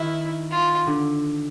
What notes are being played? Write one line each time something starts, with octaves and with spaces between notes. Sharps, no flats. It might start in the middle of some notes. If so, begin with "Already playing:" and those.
Already playing: D#3 E4
F4
D3